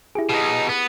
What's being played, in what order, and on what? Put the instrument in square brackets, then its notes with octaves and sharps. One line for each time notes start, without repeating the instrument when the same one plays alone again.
[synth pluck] E4 G4 G#4
[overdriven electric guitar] B2 D#4
B3